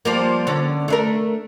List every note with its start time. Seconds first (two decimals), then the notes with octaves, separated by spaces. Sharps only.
0.05 F3 G3 A#3
0.47 D3 C#4 D4
0.88 A3 D4 A#4